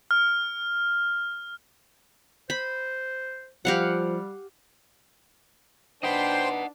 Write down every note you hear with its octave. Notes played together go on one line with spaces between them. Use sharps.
F6
C5 B5
F3 G3 G4 F5 F#5
D4 D#4 B4 C5 D#5 F#5 G5 C6